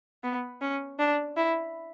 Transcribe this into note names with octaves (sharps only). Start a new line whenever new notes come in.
B3
C#4
D4
E4